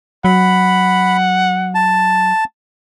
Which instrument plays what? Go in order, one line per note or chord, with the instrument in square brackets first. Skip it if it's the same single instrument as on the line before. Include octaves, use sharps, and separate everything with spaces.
[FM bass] F#3 [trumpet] F#5 [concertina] B5
[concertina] A5